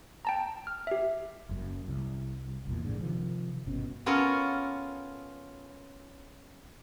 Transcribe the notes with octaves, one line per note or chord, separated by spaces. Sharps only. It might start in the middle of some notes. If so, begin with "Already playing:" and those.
G5 A5 A#5
F6
G4 E5
F#1 F#2
C2
A#1 E2 A#2
A1 G#2 D3
C3 D#3 F3
G1 B2 C#4
B3 C#4 F4 A4 A#4 C#5